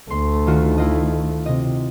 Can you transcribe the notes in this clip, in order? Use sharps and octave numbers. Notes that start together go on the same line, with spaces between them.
D2 A3 C6
D#3 F4 F#4
E4 F4 D#5
C3 D#5